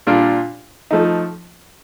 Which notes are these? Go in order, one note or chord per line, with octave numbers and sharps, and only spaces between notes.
A#2 G3 D4 F4
F3 A3 D#4